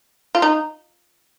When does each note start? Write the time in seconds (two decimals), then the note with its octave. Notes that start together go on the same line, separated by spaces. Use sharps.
0.35 F4
0.42 D#4